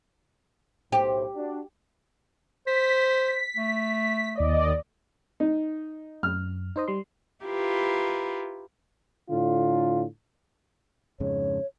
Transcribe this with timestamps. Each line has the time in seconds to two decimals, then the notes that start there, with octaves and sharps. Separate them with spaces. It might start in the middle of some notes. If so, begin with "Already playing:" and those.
0.92 B1 A2 G4 C5
1.35 D4 F#4
2.67 C5 B6
3.57 A3
4.35 D#2 D5 D#5
5.40 D#4
6.23 F#2 F6
6.76 D#4 C5 D#5
6.88 G3 C6
7.44 E4 F4 G4 A#4 B4
9.30 A2 D3 F4
11.20 F2 G#2 C#3 C#5